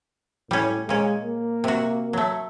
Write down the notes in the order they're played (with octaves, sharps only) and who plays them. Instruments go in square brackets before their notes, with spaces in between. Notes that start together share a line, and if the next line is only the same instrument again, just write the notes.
[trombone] A2 [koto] G3 C#4
[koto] A#2 C#4 [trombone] G#3
[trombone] A#3
[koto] C3 F#4
F#3 A3